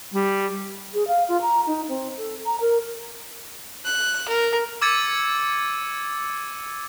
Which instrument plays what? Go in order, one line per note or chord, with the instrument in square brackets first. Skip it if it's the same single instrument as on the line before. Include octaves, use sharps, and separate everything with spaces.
[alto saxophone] G3
[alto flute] G#4
F5
F4
A#5
D#4
C4
A4
A#5
A#4
[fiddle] F#6
A#4
[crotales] D6 E6 G#6 A6 C#7 D#7